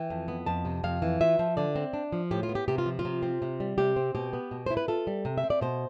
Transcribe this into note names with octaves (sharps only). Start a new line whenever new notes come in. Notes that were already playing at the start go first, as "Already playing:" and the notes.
Already playing: E3 G5
F2
B3
F2 A5
C3
F2 F5
E3
F4 E5
F3
D3 D5
C4
D4
F3
A2 G4
F4
B3
G4
C3 G4
F4
F3
F4
C3
C4
C3
G3
C3 G4
C4
B2 G4
B3
B2
E4 C5
B4
F4 A4
G3
C3
E5
C4
D5
B2 C5